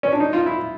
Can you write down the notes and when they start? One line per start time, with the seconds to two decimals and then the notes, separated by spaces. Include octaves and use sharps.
0.03 C#4
0.12 D4
0.20 D#4
0.33 F4
0.46 E4